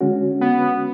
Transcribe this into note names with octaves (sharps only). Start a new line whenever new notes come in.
D3 G#3 C#4 F#4
B3